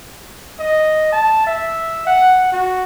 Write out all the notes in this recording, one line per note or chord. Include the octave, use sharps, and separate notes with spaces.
D#5
A5
E5
F#5
F#4